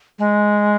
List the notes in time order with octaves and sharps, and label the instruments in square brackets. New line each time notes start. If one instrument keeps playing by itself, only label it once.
[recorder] G#3